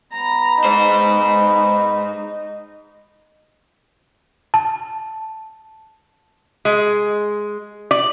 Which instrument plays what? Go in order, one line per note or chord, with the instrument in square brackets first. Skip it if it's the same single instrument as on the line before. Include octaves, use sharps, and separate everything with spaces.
[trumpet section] B3 B5 [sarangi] A#5
[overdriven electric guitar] G#2 C5 [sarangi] D#4
[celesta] A5
[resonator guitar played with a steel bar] G#3
D5